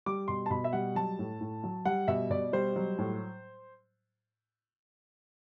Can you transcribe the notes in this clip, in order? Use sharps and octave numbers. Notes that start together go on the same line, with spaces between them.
G3 D6
B2 C6
A5
B2 B5
E5
G3 F#5
F#3 A5
A2
A2
F#3
G3 F#5
B2 E5
B2 D5
G3 C5
F#3
A2